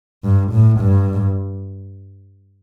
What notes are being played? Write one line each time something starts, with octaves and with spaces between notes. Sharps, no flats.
G2
A2
G2